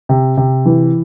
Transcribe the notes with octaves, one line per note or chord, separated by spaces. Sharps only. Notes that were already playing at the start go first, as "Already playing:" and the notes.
C3
C3
E3